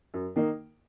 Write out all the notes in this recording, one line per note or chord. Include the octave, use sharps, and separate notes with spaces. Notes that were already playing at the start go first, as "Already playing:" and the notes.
F#2
D#3 A#3 D#4